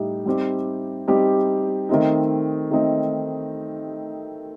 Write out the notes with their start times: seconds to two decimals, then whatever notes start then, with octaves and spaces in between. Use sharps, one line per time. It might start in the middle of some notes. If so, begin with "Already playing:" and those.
Already playing: A2 G3 D#4 G4
0.26 G3 C4 D#4 G4
1.07 G3 C4 D#4 G4
1.89 D#3 A3 C4 D#4
2.71 D#3 A3 C4 D#4